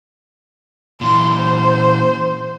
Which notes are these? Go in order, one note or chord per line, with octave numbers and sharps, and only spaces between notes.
A#2 E3 C6
C5